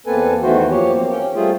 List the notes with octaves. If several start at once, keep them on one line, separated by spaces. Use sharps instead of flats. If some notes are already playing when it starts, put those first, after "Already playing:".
E2 A#3 C4 A4 B4 G#5
E2 D#3 E3 A3 F#4 C5
F#2 F3 A#3 G4 C#5
A#3 C4
C#4 G5
G3 A3 F4 G#4 C5